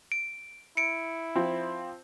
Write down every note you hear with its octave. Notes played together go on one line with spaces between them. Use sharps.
D7
E4 C#7 D7
F3 C4